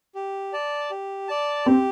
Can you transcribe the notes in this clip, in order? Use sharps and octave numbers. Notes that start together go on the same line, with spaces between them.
G4
D5 A5
G4
D5 A5
C4 G4